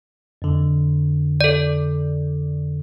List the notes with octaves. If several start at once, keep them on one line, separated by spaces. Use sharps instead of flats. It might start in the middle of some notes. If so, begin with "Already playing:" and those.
F2 D3
A4 D5